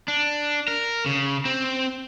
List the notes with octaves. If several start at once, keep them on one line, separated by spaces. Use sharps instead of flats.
D4
A#4
C#3
C4